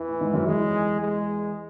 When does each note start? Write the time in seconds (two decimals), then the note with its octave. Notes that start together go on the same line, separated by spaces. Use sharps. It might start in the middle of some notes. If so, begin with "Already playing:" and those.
Already playing: E2 E3
0.08 A2
0.21 G#2
0.34 F#2
0.46 E2 G#3
1.02 G#3